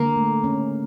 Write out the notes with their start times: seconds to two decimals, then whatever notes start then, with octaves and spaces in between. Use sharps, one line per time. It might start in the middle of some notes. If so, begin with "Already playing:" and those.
Already playing: D3 A#3
0.17 A3
0.44 C#4